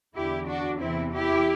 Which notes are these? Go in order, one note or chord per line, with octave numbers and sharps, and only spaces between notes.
E2 D3 E4 G4
D4 F#4
E2 C3 E3 C4 E4
E4 G4